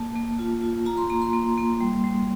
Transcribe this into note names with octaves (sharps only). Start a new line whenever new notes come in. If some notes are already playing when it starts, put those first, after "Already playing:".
Already playing: A#3 A5
A#3
F4
F4
F4 A#5
C6
A#3 A#5
C6
A#3
A#3
G3
G3